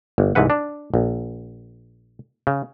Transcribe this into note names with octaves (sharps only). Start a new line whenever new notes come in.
G1
C2 G#2 E3 B4 F#5
D4
A#1
C#3